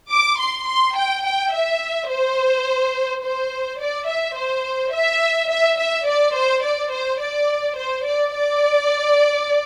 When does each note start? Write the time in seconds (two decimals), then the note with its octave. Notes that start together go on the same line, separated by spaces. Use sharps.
0.11 D6
0.39 C6
0.68 C6
0.97 G5
1.25 G5
1.53 E5
2.10 C5
3.24 C5
3.80 D5
4.09 E5
4.37 C5
4.94 E5
5.51 E5
5.79 E5
6.08 D5
6.36 C5
6.64 D5
6.92 C5
7.21 D5
7.77 C5
8.06 D5
8.34 D5